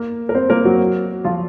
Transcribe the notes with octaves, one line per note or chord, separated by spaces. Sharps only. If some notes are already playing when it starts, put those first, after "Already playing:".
Already playing: A#3 A#4
A#4
C4 C5
A#3 A#4
F#3 F#4
F3 F4